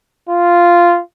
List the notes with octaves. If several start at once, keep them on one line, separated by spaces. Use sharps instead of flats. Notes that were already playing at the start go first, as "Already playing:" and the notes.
F4